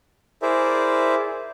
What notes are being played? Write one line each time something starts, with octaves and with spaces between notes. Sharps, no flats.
E4 G#4 A#4 C5 D5 E5